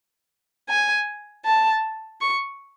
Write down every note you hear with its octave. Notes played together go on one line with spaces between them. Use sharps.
G#5
A5
C#6